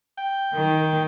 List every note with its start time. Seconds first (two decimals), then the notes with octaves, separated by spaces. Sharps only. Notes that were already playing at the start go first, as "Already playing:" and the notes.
0.17 G5
0.53 D#3